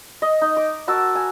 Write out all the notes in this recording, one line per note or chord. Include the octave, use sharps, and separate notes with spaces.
D#5
D#4
D6
F#4 A#4 A5 E6
G#5